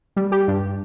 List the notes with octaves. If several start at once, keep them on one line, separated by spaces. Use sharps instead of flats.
G3
G4
G2